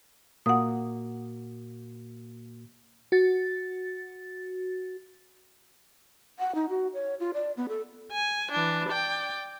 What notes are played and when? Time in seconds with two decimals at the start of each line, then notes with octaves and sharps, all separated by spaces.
0.46 A#2 A#3 F#4 F#5 D#6
3.12 F#4 A6
6.39 F#5
6.55 D#4
6.69 F#4
6.94 C#5
7.20 F4
7.34 D5
7.57 B3
7.69 A4
8.12 G#5
8.52 E3 D4
8.89 D5 G5